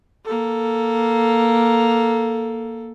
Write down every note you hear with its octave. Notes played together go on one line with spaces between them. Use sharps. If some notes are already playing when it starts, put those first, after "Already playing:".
A#3 A4